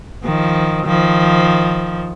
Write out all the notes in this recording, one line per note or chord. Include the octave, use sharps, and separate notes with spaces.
D#3 F3
D#3 F3